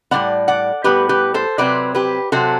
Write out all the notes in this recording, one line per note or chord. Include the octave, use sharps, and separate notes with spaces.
A2 G3 B3 D5 F#5
D5 F#5
A2 G3 B3 G4 B4
G4 B4
A4 C5
C3 F#3 C4 B4 D5
G4 B4
C3 F#3 C4 F#4 A4